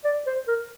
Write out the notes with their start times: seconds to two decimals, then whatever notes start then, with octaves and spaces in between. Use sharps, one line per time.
0.05 D5
0.27 C5
0.48 A#4